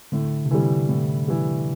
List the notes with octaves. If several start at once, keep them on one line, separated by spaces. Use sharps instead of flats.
A2 D3
C3
D3 E3 G3
A2
E3 G3